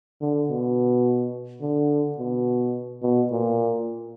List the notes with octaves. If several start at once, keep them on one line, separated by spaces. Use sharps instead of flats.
D3
B2
D3
B2
B2
A#2